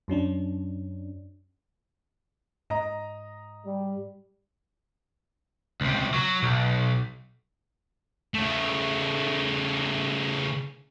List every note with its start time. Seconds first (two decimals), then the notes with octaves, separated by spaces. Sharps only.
0.08 F#2 F#3 C#4 D4
2.70 G#2 D#5 A#5
3.64 G3
5.81 C#2 C3
6.14 F#3
6.43 B1
8.34 C#3 A3